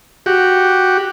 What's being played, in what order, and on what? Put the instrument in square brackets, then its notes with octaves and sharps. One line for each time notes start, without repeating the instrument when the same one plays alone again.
[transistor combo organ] F#4 G4